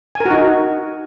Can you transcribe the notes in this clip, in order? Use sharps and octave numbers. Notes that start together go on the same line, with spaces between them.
G#5
A#4
F#4
D#4